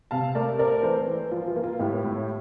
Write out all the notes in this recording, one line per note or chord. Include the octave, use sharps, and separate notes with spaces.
C3 F5 A5
A3 A#4 D5
C4 A#4 D5
E3 A4 C5
E3
F3 F4
F4
A#3
F4
A2 E4 G4
A2